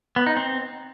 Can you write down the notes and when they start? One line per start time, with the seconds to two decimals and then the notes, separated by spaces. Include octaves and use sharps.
0.16 B3
0.27 D#4
0.37 C4